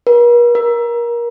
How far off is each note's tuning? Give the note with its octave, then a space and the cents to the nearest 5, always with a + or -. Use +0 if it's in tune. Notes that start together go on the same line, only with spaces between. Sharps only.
A#4 +45
A#4 +25